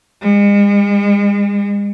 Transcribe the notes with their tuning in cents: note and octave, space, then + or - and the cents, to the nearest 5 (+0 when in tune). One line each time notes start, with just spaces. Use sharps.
G#3 -45